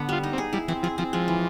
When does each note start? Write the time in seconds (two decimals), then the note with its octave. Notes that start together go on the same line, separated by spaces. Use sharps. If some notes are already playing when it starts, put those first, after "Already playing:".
Already playing: D3 B3
0.09 G3 F4
0.23 D#4
0.33 C4
0.38 G#4
0.53 G3 E4
0.68 E3 C4
0.83 F3 G#4
0.98 F3 C4
1.13 F3 G#3
1.28 E3